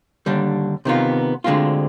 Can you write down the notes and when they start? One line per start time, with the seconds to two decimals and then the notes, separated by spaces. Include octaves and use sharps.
0.26 D#2 D3 G3 D4
0.85 C3 D#3 B3 F4
1.44 D2 D3 G#3 C4 F4